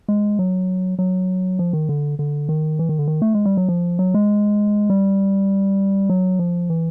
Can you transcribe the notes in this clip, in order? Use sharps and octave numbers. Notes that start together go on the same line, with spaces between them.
G#3
F#3
F#3
F3
D#3
D3
D3
D#3
E3
D#3
D3
D#3
A3
G#3
G3
F#3
F3
F#3
G#3
G3
F#3
F3
E3